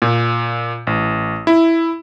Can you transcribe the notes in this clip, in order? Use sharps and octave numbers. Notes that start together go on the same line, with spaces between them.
A#2
A1
E4